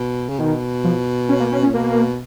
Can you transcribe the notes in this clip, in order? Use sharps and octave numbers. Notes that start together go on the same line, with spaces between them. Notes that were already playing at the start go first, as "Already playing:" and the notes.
Already playing: B2
C#3
B2 D#3
F3
C#4
A#3
C#4
C#4
A#2
B2 A#3